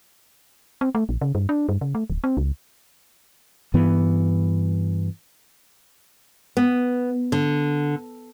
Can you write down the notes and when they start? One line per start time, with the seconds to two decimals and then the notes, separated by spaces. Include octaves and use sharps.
0.81 C4
0.95 A3
1.09 A#1
1.21 C#3
1.35 G2
1.49 D4
1.69 G2
1.81 C#3
1.95 A3
2.10 D1
2.24 C4
2.37 C#2
3.74 G2 E3 B3
6.57 B3
7.32 D3